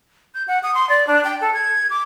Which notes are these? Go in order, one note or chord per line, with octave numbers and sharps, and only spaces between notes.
G6
F#5
D#6
C6
D5
D4
G5
A4
G#6
D6